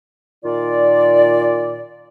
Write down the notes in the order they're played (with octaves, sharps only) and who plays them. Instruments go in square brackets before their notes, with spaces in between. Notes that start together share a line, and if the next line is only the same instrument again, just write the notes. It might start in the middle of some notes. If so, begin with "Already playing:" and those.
[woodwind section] A#2 D#3 F4 D5